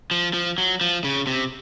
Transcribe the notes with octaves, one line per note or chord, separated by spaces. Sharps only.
F3
F3
F#3
F3
C#3
C3